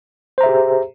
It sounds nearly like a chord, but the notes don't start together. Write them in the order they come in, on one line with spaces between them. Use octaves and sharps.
C5 A#5 E5 G#4 G4